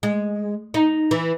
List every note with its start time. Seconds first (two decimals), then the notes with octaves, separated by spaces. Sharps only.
0.03 G#3
0.74 D#4
1.11 E3